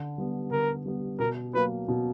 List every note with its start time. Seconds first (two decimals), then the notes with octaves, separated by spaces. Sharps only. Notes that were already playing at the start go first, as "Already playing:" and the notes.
Already playing: D3
0.18 G3 B3
0.51 D3 A#4
0.86 G3 B3
1.19 B2 A#4
1.54 F#3 A#3 B4
1.88 B2